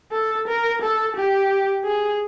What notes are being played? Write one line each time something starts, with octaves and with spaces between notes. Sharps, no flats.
A4
A#4
A4
G4
G#4